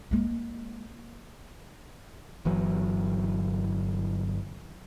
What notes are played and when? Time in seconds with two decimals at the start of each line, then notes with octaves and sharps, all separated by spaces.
0.11 G#3 A#3
2.45 G1 E3 F#3